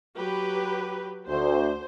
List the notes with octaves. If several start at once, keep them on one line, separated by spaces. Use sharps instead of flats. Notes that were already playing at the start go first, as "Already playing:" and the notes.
F#3 G4 B4
D2 C5